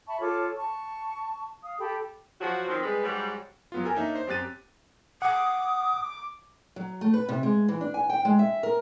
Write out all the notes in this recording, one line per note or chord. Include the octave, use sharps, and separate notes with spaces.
E5 A5 B5 C#6
F4 A4 C#5 D6
A5 C#6
F5 D#6
G4 A4 G5 B5
F3 F#3 F#4
D#3 F3 C4
G3 G#3 B4
G#2 F#3 G3
F#3 B3 F4
G4 A4 A#4 G#5
A#3 D4 D#4 C#5 E5
C5
F#2 C4 G4 F#6 A6 D#7
F#5 D6 D#6
F#3
A3
B4
C3
G#3
E3
D4
G#5
G5
G#3
E5
A#4